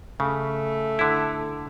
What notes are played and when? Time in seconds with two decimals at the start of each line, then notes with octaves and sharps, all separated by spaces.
0.20 C#3 A3
0.99 D3 E4